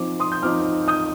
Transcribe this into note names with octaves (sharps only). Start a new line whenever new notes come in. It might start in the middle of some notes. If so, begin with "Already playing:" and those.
Already playing: F3 C4 D#4 D6
C6 D#6
G6
F3 C4 D#4 D6 F6
D#6 G6